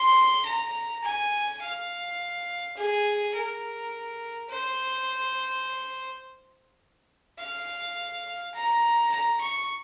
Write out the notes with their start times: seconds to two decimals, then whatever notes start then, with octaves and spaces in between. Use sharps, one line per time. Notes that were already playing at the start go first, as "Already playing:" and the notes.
Already playing: C6
0.45 A#5
1.04 G#5
1.61 F5
2.77 G#4
3.35 A#4
4.50 C5
7.39 F5
8.54 A#5
9.12 A#5
9.41 C#6